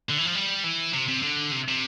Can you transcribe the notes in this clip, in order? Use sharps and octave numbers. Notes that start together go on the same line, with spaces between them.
D3
E3
F3
G3
E3
C3
C3
D3
C3
C3